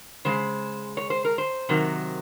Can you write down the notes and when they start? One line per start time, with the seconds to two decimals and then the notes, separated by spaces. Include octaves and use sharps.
0.25 C#3 G#3 C5
0.97 C#5
1.10 C5
1.25 A#4
1.38 C5
1.69 C3 D#3 F#3